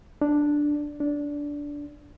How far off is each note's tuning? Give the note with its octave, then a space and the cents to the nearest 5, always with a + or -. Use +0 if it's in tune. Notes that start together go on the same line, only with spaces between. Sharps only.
D4 +0
D4 -15